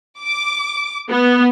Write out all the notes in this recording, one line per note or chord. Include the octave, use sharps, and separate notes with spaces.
D6
B3